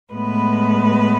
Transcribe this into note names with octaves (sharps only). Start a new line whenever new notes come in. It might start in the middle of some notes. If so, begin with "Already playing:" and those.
A2 G#3 B3 B4